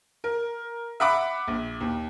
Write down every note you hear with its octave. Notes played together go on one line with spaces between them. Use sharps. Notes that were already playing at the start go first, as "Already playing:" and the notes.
A#4
E5 F#5 B5 D6
A#1
D#2